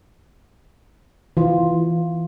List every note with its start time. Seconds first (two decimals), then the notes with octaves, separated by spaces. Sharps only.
1.37 E3 F4